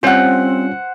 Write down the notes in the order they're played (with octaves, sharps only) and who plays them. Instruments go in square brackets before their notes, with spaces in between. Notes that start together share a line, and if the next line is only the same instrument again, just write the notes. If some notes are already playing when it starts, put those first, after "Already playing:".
[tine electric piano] G3 C#4 F4 [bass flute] C4 [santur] C5 F#5